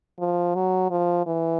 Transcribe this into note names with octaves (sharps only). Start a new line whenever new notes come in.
F3
F#3
F3
E3